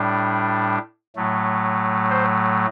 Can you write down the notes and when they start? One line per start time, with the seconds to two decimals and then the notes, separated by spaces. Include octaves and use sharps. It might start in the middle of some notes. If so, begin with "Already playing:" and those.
Already playing: A2 G3 D4
1.16 A2 F#3 A3
2.10 C5